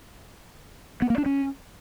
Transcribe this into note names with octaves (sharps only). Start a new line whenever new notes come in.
B3
A#3
D4
C#4